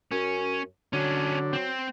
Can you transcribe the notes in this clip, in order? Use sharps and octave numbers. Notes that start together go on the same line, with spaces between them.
F#2 C#4
D3 F#3 C#4 D4
C4